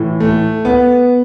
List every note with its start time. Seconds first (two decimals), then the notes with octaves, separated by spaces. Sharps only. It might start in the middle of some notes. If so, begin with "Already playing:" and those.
Already playing: A2 E3
0.20 A3
0.65 B3